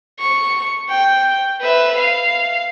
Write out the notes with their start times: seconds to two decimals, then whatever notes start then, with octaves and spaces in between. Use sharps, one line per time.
0.20 C#6
0.90 G5
1.61 B4 E5
1.98 F5